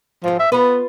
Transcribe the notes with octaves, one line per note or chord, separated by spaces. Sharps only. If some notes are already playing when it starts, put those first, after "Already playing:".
G#2 F3 C4
E5
B3 F4 B4